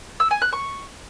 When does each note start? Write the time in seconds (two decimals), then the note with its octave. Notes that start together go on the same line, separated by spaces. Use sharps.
0.20 E6
0.31 G#5
0.42 F#6
0.53 C#6